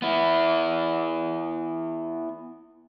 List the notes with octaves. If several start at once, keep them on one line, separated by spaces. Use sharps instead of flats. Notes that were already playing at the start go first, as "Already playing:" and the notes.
B3 E4